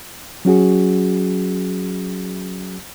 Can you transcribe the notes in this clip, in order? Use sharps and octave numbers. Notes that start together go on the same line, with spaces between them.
F#3 C#4 F#4 G#4